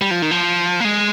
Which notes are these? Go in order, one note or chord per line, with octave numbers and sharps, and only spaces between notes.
G3
F3
D#3
F3
A#3
G#3